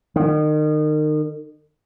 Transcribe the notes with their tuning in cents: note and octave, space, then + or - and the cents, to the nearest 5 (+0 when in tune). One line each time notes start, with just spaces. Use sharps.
D#3 -30